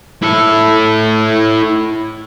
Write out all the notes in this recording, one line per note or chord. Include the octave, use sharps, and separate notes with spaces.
E4 A4